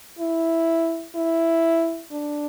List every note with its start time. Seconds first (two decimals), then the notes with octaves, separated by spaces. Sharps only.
0.19 E4
1.15 E4
2.12 D4